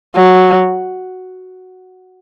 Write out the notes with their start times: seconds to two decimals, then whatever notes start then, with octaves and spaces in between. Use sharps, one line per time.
0.16 F#3